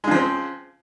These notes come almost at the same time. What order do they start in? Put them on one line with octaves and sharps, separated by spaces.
G#3 C#3 F3 C4